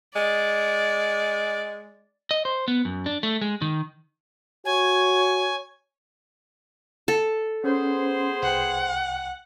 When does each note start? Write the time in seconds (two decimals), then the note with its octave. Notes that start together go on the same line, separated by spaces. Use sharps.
0.16 G#3 D5
2.31 D#5
2.45 C5
2.68 B3
2.85 F#2
3.06 D4
3.23 A3
3.41 G#3
3.62 D#3
4.65 F#4 C#5 G#5
7.08 A4
7.64 B3 C#4 G#4 C5
8.43 C2 F#5 G5